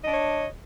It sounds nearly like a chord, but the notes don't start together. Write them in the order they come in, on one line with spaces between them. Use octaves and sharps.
D#5 D4 C#5